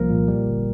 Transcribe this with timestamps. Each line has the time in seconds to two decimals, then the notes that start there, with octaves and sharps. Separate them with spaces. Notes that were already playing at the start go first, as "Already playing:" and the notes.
Already playing: C2 F3 A#3 A#4
0.10 A#2
0.28 G3
0.46 G1